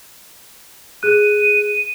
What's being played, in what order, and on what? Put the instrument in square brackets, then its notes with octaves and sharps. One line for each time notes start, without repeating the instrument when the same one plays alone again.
[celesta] G#4 F#6 [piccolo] D#7